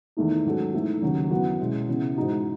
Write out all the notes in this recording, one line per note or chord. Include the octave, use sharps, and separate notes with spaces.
E2 D#3 A3 D#4
G#2 F#3 C#4 F#4 A4
G#2 E3 A3 D#4 A4
D#2 C#3 F#3
F#2 E3 B3 F#4
B2 G#3 C#4 E4
C#3 E3 B3
G#2 E3 G#3 D#4 F#4